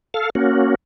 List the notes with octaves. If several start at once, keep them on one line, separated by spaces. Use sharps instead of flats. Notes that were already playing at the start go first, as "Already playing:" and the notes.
A4 F5
A#3 C#4 F#4